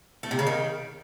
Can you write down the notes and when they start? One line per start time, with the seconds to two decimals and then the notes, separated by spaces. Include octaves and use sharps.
0.23 A3
0.31 C3
0.39 C#3
0.47 D#3